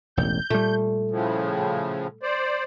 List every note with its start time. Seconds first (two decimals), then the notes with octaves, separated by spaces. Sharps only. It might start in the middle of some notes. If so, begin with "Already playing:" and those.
0.17 E1 A1 G6
0.50 A#2 G3 A3
1.11 A2 C#3 F3
2.23 C5 D5